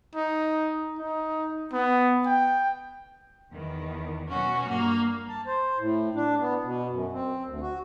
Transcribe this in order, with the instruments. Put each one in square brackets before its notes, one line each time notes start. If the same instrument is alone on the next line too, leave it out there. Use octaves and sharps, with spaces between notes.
[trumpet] D#4
D#4
B3
G5
[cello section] E2 D#3
[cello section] B2 F#3 F#4 [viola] C#4
[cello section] G2 [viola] A#3
[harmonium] A5
C5
A2
D4
B3
B2
F#2
C4
D2
F#4